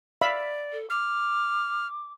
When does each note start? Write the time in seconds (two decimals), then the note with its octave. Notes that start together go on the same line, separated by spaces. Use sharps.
0.21 D5 E5 F5 B5
0.72 A4
0.90 D6 F6